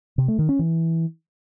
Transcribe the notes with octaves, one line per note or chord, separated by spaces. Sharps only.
C3
A3
D#3
C#4
E3